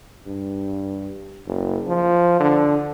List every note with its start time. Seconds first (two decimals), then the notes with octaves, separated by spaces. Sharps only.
0.27 G2
1.47 F#1
1.88 F3
2.40 D3